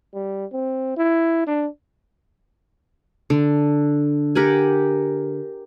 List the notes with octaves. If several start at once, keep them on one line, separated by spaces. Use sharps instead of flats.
G3
C4
E4
D4
D3
G4 A#4 F#5 G#5